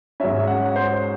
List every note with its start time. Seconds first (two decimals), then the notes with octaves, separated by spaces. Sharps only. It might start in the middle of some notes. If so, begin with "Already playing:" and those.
0.20 G#2 F#3 C#4 E5
0.47 F#5
0.66 F#5
0.76 C5